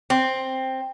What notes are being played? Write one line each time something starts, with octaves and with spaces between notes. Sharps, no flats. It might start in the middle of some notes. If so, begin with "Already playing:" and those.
C4